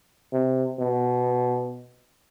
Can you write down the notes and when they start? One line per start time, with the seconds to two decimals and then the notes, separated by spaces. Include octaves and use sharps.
0.33 C3
0.79 B2